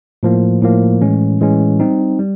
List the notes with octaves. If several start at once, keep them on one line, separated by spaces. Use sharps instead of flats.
A2 F3 A#3
A2 F3 A#3
A2 E3 G#3 C#4
A2 E3 G#3 C#4
G3 C4 D#4
G3